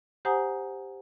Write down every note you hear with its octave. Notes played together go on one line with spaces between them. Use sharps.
G4 C5 F#5 G#5 A#5 D#6